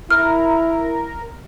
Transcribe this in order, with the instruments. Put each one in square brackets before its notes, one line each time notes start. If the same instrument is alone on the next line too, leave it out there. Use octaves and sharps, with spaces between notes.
[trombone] E4 [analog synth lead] A#4 [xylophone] F6